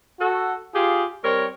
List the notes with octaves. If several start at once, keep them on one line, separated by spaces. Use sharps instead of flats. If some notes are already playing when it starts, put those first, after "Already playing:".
F#4 A4
F4 G4 G#4
G3 C4 A#4 C#5